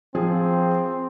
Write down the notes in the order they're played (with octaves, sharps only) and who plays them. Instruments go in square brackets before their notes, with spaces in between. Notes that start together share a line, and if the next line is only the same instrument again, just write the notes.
[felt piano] F3 G#4 [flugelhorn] C4